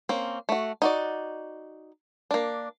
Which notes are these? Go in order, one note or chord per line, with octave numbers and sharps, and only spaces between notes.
A#3 C4 C#4
A3 F#4
D#4 F#4 D5
A#3 D4